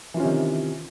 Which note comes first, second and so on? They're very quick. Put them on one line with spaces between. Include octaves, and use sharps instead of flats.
E3 F4 C#4 C3 D#3